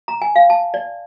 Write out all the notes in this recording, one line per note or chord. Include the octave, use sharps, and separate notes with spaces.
A#5
G#5
F5
A5
D5